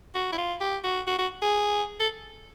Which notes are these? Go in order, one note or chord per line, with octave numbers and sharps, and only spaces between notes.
F#4
E4
F4
G4
F#4
F#4
F#4
G#4
A4